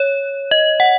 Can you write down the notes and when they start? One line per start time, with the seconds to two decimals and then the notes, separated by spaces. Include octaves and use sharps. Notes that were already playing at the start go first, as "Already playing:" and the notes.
Already playing: C#5
0.51 D#5
0.80 F#5